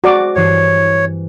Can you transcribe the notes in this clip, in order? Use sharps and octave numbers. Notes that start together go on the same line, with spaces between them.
G#3 C4 F#4 D5 D6
G2 E3 C#5 C7